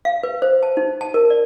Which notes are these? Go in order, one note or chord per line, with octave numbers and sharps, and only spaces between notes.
F5
B4
C5
A5
D#4
A5
A#4
D5